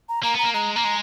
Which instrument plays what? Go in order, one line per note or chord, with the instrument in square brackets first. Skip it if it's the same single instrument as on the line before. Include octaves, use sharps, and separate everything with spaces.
[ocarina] A#5
[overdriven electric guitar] A#3 [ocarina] A#5
[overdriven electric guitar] B3 [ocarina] A#5
[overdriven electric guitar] A#3
[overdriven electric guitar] G#3 [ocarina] A#5
[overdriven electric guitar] A#3 [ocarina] A#5
[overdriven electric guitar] G#3